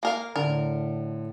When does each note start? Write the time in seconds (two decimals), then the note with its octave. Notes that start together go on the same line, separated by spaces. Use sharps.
0.03 A#3 A#4 F5
0.36 A2 D3 A#4